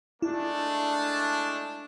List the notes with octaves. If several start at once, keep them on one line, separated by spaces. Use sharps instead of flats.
G#3 A3 D4 E4